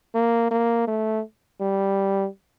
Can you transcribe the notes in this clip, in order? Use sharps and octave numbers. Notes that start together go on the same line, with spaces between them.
A#3
A#3
A3
G3